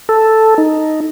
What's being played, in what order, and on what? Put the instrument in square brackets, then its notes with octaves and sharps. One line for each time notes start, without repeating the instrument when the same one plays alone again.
[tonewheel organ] A4
D#4